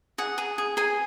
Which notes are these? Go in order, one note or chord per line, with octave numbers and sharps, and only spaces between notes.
G#4 F#5
G#4
G#4
G#4 G#5